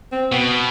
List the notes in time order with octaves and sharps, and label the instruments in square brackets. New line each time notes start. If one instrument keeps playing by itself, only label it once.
[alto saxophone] C4
[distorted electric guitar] B2 [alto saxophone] B3